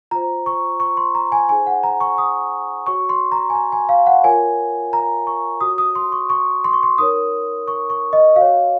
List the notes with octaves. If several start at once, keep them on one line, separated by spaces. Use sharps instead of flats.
F4 C5 A#5
C#6
C#6
C6
A#5
G#5
D#4 G#4 C5 G#5
F#5
A#5
C#6
D#6
F#4 C#5 C#6
C6
A#5
G#5
A#5
G#5
F5
F#5
F4 A#4 C#5 G#5
A#5
C#6
F#4 C#5 D#6
D#6
C6
C#6
C#6
C6
C#6
C6
D#4 A#4 C#5 D#6
C#6
C#6
D#5
F#4 F5
C#5